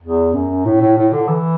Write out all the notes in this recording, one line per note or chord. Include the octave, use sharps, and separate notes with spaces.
E2
F#2
A2
A2
A2
D3
E3